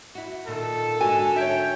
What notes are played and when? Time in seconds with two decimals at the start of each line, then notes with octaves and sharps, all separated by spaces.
0.15 E4 F#4
0.48 A#2 D#3 A4
1.01 G#2 D3 F#4 G#5
1.36 C#5 E5 G5